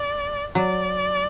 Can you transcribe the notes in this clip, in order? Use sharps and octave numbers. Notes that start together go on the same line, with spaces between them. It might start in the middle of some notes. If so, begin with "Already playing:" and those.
Already playing: D5
F#3 D5